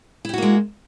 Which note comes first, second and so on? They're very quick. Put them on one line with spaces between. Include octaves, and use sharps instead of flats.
E4 G4 F#4 A#3 G#3